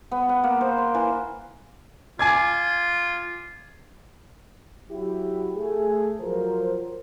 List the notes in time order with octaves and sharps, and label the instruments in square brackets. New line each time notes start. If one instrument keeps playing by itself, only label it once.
[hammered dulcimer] B3
F#5
A#3
C5
C6
E3
[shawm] F4 [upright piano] G#5 D6 G#6
[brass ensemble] F#3 E4 F#4 G4
A3 G#4
F3 F#3 A#4 C5